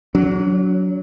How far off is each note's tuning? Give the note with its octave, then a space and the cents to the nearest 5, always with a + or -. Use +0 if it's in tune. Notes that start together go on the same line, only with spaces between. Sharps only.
F#3 +0 D4 -40